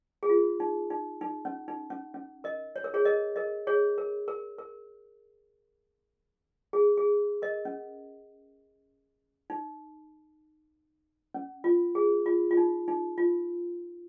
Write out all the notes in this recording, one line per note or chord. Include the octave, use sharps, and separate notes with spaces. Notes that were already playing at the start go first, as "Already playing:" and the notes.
G#4
F4
D#4
D#4
D#4
C#4
D#4
C#4
C#4
A#4 D#5
C#5
A#4
G#4 C#5
A#4 D#5
A#4 D#5
G#4 C#5
A#4
A#4
A#4
G#4
G#4
A#4 D#5
C#4
D#4
C#4
F4
G#4
F4
F4
D#4
D#4
F4